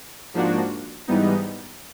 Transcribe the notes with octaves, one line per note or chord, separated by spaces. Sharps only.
G#2 F3 A#3 D4 F#4
G#2 E3 G3 B3 D#4